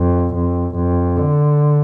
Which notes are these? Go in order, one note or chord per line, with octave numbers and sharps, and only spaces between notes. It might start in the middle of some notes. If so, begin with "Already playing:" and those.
Already playing: F2
F2
F2
D3